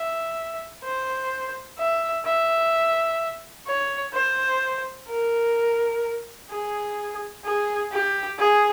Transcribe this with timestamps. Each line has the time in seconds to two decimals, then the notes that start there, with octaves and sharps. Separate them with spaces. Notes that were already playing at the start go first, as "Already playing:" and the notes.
Already playing: E5
0.84 C5
1.78 E5
2.25 E5
3.67 C#5
4.14 C5
5.08 A#4
6.50 G#4
7.45 G#4
7.92 G4
8.39 G#4